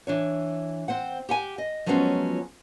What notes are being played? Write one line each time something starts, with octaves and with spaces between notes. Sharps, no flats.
E3 D4 C#5
C4 C5 F#5
G4 F#5 G#5
D#5
F3 F#3 G#3 B3 C#4 F4